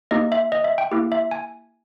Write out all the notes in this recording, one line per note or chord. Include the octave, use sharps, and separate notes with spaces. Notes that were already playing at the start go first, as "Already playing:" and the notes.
A#3 D#4 G4 D#5
E5
D#5
E5
G5
A#3 E4 G4
E5
G#5